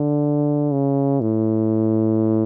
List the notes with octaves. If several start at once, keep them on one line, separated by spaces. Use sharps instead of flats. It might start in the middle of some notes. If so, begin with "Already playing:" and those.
Already playing: D3
C#3
A2